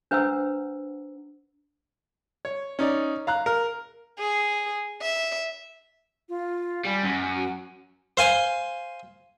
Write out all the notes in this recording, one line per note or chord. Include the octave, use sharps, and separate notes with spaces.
D4 B4 C5 F#5 A#5 E6
C#5
C#4 D#4 D5
F5 A#5 F#6
A#4
G#4
E5
F4
G3 G#5
F#2
F#4
C5 F5 G#5 C6